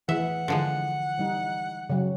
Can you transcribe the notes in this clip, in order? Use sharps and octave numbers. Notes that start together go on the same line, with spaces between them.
E3 G#4 E5 F#5
D3 F3 G#3
E3 G3 D#4
C#3 F#3